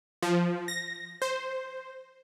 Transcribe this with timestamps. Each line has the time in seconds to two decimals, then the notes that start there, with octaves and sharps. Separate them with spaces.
0.22 F3
0.68 A#6
1.22 C5